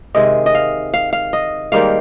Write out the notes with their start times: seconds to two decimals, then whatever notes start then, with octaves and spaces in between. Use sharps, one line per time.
0.15 C3 D#3 G#3 D#5
0.46 D#5
0.55 F5
0.94 F5
1.13 F5
1.33 D#5
1.72 G#2 D#3 G3 A#3 F5